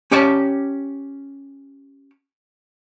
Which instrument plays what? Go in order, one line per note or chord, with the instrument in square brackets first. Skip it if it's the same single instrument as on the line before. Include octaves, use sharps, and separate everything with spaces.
[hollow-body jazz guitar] C#4 G4 C#5 D5 A5